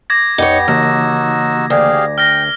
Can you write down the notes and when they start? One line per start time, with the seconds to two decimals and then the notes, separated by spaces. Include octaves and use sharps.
0.10 D6 G#6 A#6
0.38 A#1 F2 B3 D#4 G4 C#5
0.68 D#2 C#3 E3 A#3 D#4 F#4 E6
1.70 D2 G4 G#4 F5
2.18 G5 F6 A#6